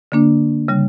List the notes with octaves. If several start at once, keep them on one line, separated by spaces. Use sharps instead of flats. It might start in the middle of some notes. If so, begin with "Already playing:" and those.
D3 A#3 D4
C#3 G3